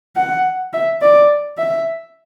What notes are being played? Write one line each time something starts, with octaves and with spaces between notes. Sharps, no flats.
F#5
E5
D5
E5